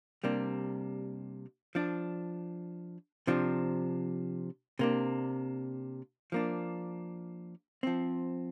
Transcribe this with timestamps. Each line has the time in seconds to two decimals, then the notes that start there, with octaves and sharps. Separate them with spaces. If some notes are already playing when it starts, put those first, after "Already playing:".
0.24 C3 G3 A#3 D4
1.75 F3 D4
3.27 C3 F3 D4
4.79 C3 A#3 D4
6.32 F3 A#3 D4
7.83 F3 C4